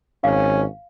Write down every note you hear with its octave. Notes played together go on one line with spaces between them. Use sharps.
G#1 C#4 F5